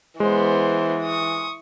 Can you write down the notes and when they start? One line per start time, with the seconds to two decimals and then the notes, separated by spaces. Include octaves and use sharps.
0.20 E3 G#3 B3 C5
1.04 C#6 D#6